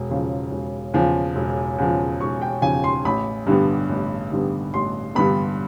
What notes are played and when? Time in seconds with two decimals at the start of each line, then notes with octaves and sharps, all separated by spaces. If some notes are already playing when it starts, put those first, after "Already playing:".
Already playing: E1
0.09 E2 C#3 F3
0.51 E1
0.94 E2 C#3 F3
1.36 E1
1.78 E2 C#3 F3
2.21 E1 C#6
2.42 G5
2.62 E2 C#3 F3 G#5
2.84 C6
3.05 A1 B5
3.47 G2 D3 G3 B3
3.89 A1
4.31 G2 D3 G3 B3
4.74 A1 C6
5.15 G2 D3 G3 B3 B5